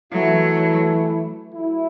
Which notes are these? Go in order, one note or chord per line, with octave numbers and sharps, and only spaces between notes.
E3 F#3 A3 E4
F#3 A3 E4